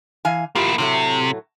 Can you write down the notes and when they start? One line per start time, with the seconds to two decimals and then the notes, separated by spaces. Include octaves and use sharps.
0.25 E3 F5 G#5
0.55 A#3 E4 F4 G4
0.78 A2 C3 F#3 A3